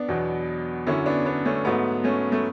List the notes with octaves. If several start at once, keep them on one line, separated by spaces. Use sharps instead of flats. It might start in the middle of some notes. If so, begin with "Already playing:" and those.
Already playing: B3 D4
E2 B2 F#3
F#2 D3 F#3 C#4 E4
B3 D4
B3 D4
A3 C#4
G#2 F#3 A3 B3
A3 C#4
A3